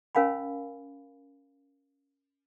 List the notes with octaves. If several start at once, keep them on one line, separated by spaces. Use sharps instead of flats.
C#4 A#4 F5 G#5 B5